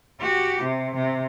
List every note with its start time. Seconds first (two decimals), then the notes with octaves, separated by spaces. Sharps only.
0.21 F#4 G4
0.62 C3
0.95 C3